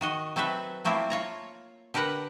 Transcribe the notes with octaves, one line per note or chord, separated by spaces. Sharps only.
D#3 F#4 D#5
F#3 C4 A4 B4 E5
F#3 A3 A#3 C4 E4 F4
F4 C#5 A#5
D3 G4 A#4 B4 F#5